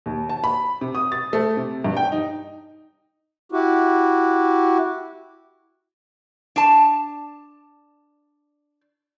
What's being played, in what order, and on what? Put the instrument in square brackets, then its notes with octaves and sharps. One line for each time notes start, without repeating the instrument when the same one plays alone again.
[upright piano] D#2
A5
B5
C3
D#6
A6
A3
C3
G2
G5
D#4
[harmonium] E4 F#4 G4
[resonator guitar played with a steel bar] D4 A5